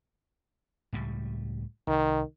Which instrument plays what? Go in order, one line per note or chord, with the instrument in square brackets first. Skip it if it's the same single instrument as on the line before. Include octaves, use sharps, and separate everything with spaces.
[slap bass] C#2 A2 G3
[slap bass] C2 [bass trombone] D#3